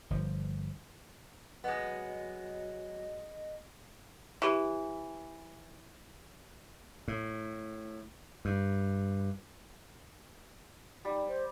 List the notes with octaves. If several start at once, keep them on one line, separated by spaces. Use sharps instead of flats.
G1 F3
F#3 G#3 B3 D#5
E3 G4 B5 C#6
A2
G2
G3 D#4
C5